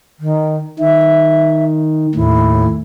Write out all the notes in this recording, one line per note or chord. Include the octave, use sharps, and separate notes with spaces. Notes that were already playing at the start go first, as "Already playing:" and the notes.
D#3
D#3 E5
D#2 A2 E4